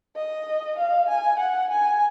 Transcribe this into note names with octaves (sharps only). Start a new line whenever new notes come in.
D#5
F5
G#5
F#5
G#5